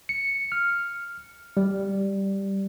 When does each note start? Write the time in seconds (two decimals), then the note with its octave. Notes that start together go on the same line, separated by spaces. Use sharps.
0.09 C#7
0.52 F6
1.57 G3